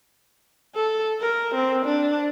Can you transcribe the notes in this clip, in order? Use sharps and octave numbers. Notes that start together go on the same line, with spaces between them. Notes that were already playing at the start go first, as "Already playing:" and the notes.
A4
A#4
C4
D4